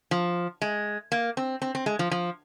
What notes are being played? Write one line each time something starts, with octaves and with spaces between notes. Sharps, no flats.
F3
G#3
A#3
C4
C4
C4
G#3
F3
F3